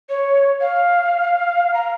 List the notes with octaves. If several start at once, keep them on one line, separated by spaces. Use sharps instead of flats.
C#5
F5
A#5